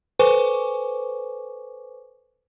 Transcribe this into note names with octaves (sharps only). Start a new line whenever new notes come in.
A4 B4 C5 G#5 C#6 D6